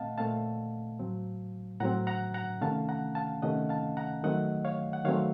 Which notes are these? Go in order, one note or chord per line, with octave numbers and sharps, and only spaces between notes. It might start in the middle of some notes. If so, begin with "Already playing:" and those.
Already playing: A#2 A3 C4 D#5 F5 F#5 A5
A#2 A3 C4 F5 A5
A2 F#3 C4
A2 F#3 C4 F#5 A#5
F#5 A#5
F#5 A#5
C3 D#3 A3 C#4 F5 A5
F#5 A#5
F5 A5
C3 D#3 A3 C#4 D#5 F#5
F5 A5
F#5 A#5
D#3 F#3 A3 C4 D#5 F#5
C#5 F5
F#5
D#3 F#3 A3 C4 C#5 F5